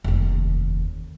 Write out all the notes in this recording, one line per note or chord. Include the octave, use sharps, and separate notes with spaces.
F1 D#2